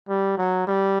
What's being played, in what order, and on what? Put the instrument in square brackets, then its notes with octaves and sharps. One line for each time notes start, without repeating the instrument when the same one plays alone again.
[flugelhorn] G3
F#3
G3